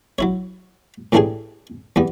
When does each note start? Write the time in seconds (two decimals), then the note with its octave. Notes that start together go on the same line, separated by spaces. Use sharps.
0.19 F#3 E4 C#5
1.12 A2 E3 A3 D4 G4 G#4
1.96 E2 G3 B3